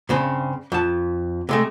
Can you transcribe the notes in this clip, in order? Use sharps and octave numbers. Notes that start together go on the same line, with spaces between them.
G2 C#3 C4
F2 A5
C3 G#3 A3